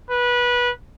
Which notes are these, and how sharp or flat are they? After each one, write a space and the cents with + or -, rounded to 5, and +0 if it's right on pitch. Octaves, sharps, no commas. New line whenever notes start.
B4 -20